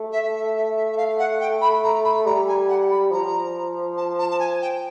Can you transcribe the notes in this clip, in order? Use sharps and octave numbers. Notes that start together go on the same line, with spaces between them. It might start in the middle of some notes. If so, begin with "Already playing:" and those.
Already playing: A3
E5
E5
E5
E5
E5
F5
F#5
G5
B5
A#5
B5
G3 A#5
G#5
F#5
B5
F3 A#5
A5
A5
A5
G#5
G5